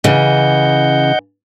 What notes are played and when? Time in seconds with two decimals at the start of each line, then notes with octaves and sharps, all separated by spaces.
0.04 C#3 E3 D#5 F#5 G6